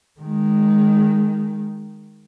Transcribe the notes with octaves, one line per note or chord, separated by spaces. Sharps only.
D#3 G#3